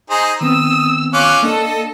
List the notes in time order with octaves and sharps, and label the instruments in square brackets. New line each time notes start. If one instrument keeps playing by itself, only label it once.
[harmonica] D#4 G#4 C5 [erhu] A#5
[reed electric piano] D#3 B3 C4 [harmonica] D#6 [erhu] E6
[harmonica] C#4 F4 D6 [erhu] F#6
[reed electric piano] A#3 D4 [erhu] A4 [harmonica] D#5